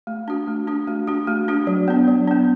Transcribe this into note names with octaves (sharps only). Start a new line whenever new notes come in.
A3
D4 F#4
A3
D4 F#4
A3
D4 F#4
A3
D4 F#4
F#3
B3 D4
F#3
B3 D4